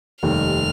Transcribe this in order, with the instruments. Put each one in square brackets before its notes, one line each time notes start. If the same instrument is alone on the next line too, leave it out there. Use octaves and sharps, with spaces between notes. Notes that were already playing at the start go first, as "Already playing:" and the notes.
[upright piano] F1 D#2 D#3 G3 [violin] F6